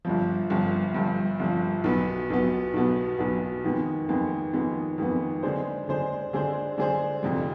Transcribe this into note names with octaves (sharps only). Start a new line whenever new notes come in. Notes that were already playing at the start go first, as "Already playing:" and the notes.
G1 G2 F3
G1 G2 F3
G1 G2 F3
G1 G2 F3
B1 B2 B3
B1 B2 B3
B1 B2 B3
B1 B2 B3
F2 D#3 G#3 B3
F2 D#3 G#3 B3
F2 D#3 G#3 B3
F2 D#3 G#3 B3
D3 G#3 D4 G#4 C5
D3 G#3 D4 G#4 C5
D3 G#3 D4 G#4 C5
D3 G#3 D4 G#4 C5
F1 F2 D3 G#3